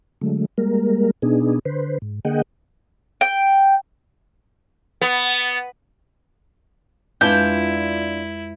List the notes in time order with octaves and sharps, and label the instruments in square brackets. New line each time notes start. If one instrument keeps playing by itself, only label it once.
[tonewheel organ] D3 F#3 G#3 A3
G3 G#3 A#3 A#4
B2 B3 D4 D#4 G#4
D3 B4 C5
G#2
D3 A#3 G#4 D#5 F#5 G5
[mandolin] G5
[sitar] B3
[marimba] F2 G#3 B4 [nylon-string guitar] D4 F4 [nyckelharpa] E4 [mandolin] G6